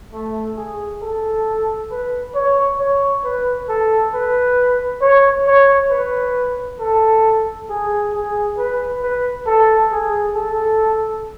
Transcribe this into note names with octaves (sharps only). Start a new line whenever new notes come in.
A3
G#4
A4
B4
C#5
C#5
B4
A4
B4
C#5
C#5
B4
A4
G#4
G#4
B4
B4
A4
G#4
A4